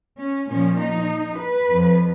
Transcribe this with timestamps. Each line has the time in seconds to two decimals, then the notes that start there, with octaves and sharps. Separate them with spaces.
0.17 C#4
0.48 A#2 F3 C#4
0.77 D#4
1.38 B4
1.68 F2 F3